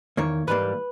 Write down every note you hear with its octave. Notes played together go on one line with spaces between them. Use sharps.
E2 D#3 A#3 C#5
G#2 E3 G3 A#3 B4